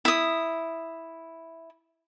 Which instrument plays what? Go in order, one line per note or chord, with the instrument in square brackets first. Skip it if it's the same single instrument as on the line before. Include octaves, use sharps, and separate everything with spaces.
[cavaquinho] E4 D#6